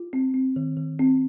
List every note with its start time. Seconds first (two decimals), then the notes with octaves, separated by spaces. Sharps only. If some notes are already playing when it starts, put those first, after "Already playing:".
Already playing: F4
0.13 C4
0.34 C4
0.56 D#3
0.77 D#3
0.99 C4